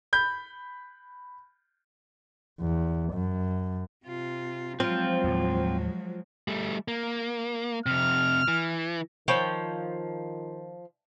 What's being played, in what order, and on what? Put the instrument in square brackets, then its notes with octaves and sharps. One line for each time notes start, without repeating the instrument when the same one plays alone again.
[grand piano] B5 G6
[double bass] E2
F#2
[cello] C3 F4
[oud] F3 [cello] F#3 G#3 [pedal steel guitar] C4 F4
[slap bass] D#2 A2
[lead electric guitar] G3 A3
A#3
[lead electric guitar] F2 C3 [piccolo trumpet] F6
[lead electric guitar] E3
[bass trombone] D#3 [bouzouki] F3 [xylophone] C5 B5 E7 [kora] C#5 G5